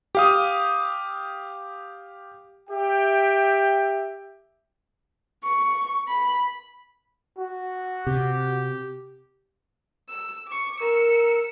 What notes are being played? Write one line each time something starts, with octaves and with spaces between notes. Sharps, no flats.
G4 F5 D#6
G4 E5 G5
C#6
B5
F#4
C3 G4
E6
C#6 D6
A#4 E6 C#7